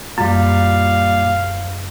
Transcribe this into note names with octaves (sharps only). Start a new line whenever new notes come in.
F#2 A#2 G3 F5